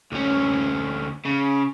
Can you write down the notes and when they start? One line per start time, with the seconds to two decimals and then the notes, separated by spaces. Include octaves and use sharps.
0.12 D2 C#4
1.25 C#3